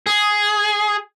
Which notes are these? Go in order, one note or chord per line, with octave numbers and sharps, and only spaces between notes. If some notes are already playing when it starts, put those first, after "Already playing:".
G#4